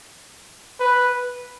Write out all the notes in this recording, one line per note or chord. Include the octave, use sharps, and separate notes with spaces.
B4